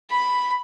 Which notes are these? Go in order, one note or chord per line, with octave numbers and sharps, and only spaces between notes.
B5